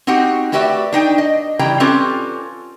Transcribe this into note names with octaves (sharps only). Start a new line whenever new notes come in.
C4 D#4 F#4 G4 F#5
A3 F#4 G4 B4 D5 E5
D4 D#4 G5
D#5
C#3 E3 G3 G5 A#5
C4 C#4 F4 G4 A4 B4